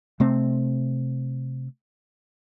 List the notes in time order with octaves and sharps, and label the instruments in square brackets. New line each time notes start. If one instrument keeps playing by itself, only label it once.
[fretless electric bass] C3 A3 C4